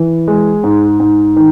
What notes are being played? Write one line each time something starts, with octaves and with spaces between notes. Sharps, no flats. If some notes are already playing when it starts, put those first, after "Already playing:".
Already playing: E3
G#3
G#2
G#2
D#3